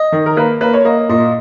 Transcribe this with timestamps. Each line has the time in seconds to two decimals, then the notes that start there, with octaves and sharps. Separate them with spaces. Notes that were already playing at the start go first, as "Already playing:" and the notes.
Already playing: D#5
0.12 D#3
0.26 A#4
0.37 A#3 B4
0.61 A#3 B4
0.74 C#5
0.85 A#3 D#5
1.09 A#2 D#5